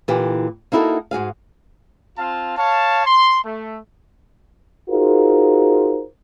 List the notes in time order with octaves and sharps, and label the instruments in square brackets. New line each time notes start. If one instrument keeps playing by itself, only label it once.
[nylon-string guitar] A#2 D3 E3 G4
A#3 D#4 E4 F#4 G4 A4
G#2 F#4 G#4 F5
[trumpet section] C4 F4 F5 A5
C#5 F5 A5
C6
A3
[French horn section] D#4 F4 F#4 G#4 A#4 C5